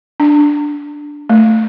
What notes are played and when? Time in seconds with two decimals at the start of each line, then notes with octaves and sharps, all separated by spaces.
0.20 D4
1.29 A3